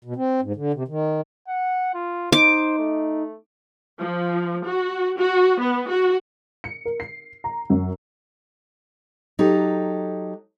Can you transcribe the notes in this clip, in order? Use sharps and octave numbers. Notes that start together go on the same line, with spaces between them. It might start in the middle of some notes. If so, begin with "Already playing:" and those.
B2
C4
G#2
D3
C3
D#3
F#5
F4
D#4 C5 D6
A3
F3
F#4
F#4
B3
F#4
C#7
A#4
C7
A#5
F#2
F#3 D#4 G4 A4